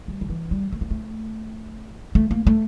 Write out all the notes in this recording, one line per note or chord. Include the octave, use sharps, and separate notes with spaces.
G3
D3
E3
G3
A3
A#3
A3
A3
A#3
A3